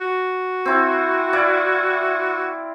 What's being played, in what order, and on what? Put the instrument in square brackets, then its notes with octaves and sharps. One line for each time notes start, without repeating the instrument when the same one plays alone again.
[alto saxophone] F#4
[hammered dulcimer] C4 E4
E4 D5 F5